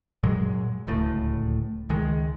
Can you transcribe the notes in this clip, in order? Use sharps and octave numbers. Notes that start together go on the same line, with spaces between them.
F#2 A#2 F#3 G#3
D1 C#2 A2 A3
C#2 D#3 G#3